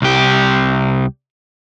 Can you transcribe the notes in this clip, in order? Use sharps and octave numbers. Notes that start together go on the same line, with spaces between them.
C2 G4